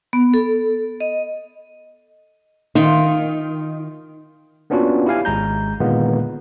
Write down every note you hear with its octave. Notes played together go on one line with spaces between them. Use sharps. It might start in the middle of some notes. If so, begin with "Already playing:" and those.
B3
A4
D#5
D#3 D#4 F4
A#3 B3 C#4 D4 F4 F#4
E4 G4 F5 G#5
G#1 G#3 A#5 G6
A#2 D3 D#3 G#3 A#3 B3